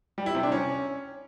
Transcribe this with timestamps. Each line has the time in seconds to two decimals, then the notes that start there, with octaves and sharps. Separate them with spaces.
0.18 G3
0.26 E4
0.35 C3
0.43 D4
0.52 C#4